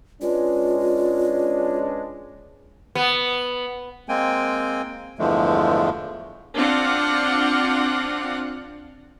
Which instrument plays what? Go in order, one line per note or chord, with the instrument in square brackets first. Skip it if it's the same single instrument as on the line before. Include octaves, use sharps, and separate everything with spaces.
[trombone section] G#3 D4 [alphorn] C#4 [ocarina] F4 [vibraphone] B4 D5
[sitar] B3
[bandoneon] G#3 A#3 C4 G5 G#5
E2 G2 D3 F3 G#3 A3
[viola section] C4 D4 F4 F5 F#5